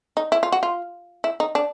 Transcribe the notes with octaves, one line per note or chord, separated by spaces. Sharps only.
D#4
E4
F4
F#4
F4
E4
D#4
D4